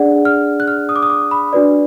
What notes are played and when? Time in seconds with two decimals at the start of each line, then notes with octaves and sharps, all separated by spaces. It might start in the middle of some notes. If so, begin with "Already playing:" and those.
Already playing: D4 G#4 D5 F#5
0.25 F6
0.60 F#6
0.68 F6
0.89 D#6
0.96 D6
1.03 D#6
1.10 D6
1.31 B5
1.53 D4 F#4 B4 D5